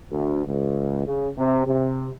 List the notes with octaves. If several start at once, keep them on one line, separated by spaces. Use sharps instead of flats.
D2
C#2
C#3
C3
C3